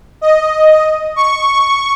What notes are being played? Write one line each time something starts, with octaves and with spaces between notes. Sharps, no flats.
D#5
C#6